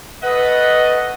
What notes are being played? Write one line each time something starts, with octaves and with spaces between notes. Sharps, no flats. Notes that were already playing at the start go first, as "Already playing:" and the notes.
A3 B4 D#5 F#5